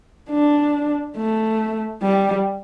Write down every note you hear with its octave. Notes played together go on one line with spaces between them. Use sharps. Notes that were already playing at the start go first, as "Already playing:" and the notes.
D4
A3
G3